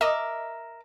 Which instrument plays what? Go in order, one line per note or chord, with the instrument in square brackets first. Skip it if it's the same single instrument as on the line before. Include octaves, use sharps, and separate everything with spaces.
[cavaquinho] A#4 E5 D6 [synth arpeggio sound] D#5